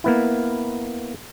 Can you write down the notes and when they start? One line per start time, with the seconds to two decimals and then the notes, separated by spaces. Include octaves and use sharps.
0.04 A#3 B3 E4